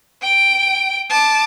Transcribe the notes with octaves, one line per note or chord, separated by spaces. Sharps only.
G5 D7
A5 D6